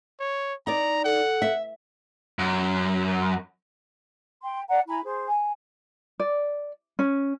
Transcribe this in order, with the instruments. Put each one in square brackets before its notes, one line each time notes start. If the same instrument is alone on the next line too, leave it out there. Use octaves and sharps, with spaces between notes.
[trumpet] C#5
[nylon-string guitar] D#4 D5 [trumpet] A#5
[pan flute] A4 [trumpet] F#5
[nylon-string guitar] E5
[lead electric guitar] F#2
[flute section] G5 C6
D5 F#5 A#5
E4 G#5 A#5 B5
G#4 C5
G#5
[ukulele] D5
C#4